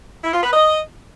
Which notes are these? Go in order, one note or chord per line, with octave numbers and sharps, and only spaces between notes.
E4
F4
B4
D#5